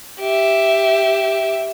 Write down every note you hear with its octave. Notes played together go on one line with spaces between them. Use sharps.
G4 E5